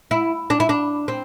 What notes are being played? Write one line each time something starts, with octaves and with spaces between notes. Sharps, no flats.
E4
D4
E4
D4
C4